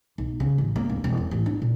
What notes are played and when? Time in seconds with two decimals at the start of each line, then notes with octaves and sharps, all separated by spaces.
0.18 B1
0.40 C#3
0.58 A1
0.76 A#3
0.90 D1
1.04 E1
1.17 F#2
1.31 A1
1.46 D4
1.62 A#2